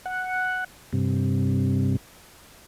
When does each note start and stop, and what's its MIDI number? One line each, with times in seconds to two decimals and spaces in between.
0.06 0.64 78
0.93 1.97 43
0.93 1.97 48